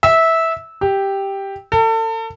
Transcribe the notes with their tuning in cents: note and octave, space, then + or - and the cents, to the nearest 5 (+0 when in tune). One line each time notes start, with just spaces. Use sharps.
E5 -15
G4 +0
A4 +35